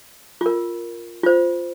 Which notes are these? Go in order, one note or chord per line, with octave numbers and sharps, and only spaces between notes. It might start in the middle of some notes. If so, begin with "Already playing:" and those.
F4 A#4
F4 C5